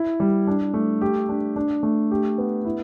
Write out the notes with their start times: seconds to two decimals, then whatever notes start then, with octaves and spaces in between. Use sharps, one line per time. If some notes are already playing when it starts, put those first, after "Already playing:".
Already playing: E4
0.20 G3
0.47 D4
0.74 A3
1.01 G4
1.29 D4
1.56 D4
1.83 A3
2.11 G4
2.38 B3
2.65 E4